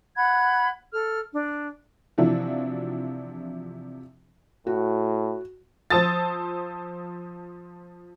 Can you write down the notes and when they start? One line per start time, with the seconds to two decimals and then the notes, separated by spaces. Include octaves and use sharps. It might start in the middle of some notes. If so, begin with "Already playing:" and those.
0.16 F#5 B5 F#6 G#6
0.92 A4 F6
1.33 D4
2.18 C3 E3 F3 D4 E4 F#4
4.67 A2 F#4
5.90 F3 C5 A5 D#6 E6 A6